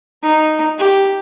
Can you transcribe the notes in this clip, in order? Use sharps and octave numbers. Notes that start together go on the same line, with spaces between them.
D#4
G4